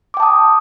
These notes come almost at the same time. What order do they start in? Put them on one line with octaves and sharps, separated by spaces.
D6 G5 A5 D#6